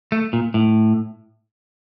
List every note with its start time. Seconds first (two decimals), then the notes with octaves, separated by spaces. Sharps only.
0.12 A3
0.33 A#2
0.54 A2